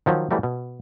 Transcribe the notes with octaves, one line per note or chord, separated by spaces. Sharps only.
D#3 F3 F#3
E3 F#3 G3 A3 A#4
B2